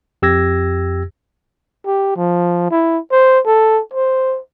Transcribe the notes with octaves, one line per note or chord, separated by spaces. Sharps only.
F2 G4 E6 G#6 A#6
G4
F3
E4
C5
A4
C5